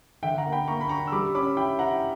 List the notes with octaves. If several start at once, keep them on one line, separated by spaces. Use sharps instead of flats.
D3 E5 G5
F#5 A#5
A#3
G5 B5
A#3 A#5 C#6
B5
D4 A#5 C#6
E6
G3 B5 D6
C#4 B5 D6
E4 G5 B5
E4 F#5 A#5